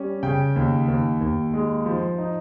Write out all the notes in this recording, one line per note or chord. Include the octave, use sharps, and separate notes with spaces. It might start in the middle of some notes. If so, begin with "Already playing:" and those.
Already playing: G3 C#4
C#3 G5
D#2
D#2
D#2
G#3
F3
D#4